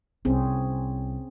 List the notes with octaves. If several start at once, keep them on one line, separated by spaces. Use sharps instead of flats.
C2 C4 C#4 G#4